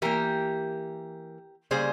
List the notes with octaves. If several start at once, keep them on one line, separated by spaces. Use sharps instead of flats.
E3 A#3 G4 A#4
C#3 G3 A#3 G#4 C5